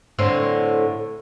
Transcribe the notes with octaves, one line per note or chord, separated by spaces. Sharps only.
A2 D3 C4